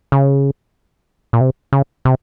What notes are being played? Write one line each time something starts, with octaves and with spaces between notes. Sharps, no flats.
C#3
A#2
C3
C#3
C3